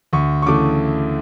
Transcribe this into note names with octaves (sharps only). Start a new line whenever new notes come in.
D2 C#6
C#6
C#3 E3 A3 D6